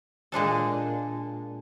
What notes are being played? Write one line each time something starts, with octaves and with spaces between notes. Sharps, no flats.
A#2 G#3 D4 A4